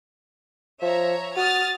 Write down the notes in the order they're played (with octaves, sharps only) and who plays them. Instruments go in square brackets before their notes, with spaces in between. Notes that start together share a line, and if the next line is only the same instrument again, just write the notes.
[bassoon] F3 [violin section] C#5 E5 A#5
[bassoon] F#4 [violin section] D#6 F6 A6